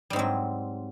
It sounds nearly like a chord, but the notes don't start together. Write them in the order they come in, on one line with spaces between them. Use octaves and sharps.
G3 G#2 C4 F#3